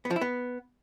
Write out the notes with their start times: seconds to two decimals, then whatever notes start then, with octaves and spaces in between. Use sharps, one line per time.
0.05 B3
0.11 F3
0.16 E4
0.21 B3